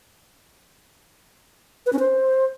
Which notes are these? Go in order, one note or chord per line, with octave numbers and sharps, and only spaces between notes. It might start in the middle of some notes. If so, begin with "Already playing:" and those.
B4
C#4
C5